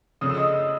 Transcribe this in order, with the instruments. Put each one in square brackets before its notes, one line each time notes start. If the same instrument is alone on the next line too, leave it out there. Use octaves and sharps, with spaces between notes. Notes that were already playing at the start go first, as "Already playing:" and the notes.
[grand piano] C#3 F3 A3 D4 [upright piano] D#6
[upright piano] E6
D#5 D#6